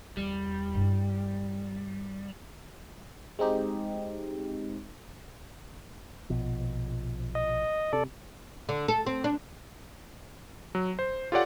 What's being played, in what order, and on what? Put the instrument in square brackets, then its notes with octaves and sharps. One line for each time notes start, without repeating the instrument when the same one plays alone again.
[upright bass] E2 [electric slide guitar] G3
[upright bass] G2 E4
[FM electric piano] G#3 C4 D#4 G4
[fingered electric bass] A#1 B2 F3
[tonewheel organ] D#5
[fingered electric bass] C3 [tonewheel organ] A4 D5
[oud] D3
A4
C4
D4
[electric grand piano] F#3
C5
F4 G4 A4 C#5 D5 F#5